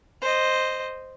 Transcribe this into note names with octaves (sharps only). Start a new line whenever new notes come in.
C5 D#5